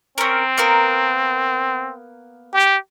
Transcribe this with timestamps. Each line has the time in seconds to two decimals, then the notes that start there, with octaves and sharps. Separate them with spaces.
0.18 C4 C#4 A#4
0.58 A#3 B3 A#4
2.53 G4